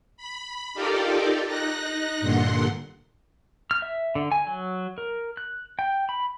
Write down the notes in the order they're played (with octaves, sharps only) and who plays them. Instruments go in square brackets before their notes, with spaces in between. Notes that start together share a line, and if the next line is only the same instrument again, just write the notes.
[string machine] B5
D#4 F4 G4 A4 A#4 D5
D#4 F#6 A#6
G2 A#2 D3 F#5 C6
[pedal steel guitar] F6
E5
D3
G#5
F#3
A#4
F#6
G5
B5